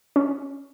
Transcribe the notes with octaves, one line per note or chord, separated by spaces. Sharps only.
C#4